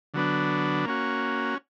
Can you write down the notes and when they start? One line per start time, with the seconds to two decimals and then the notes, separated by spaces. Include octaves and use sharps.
0.14 D3 F#3 B3 D4
0.85 A#3 C#4 F#4